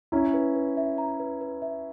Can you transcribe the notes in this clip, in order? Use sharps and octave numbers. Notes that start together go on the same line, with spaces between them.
C#4 E4 A#5
B4
B4
E5
A#5
B4
B4
E5